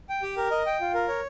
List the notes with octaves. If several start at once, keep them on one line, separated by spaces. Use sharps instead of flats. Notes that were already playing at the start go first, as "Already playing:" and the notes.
G5
G4
A#4
D#5
G5
F4
A#4
C#5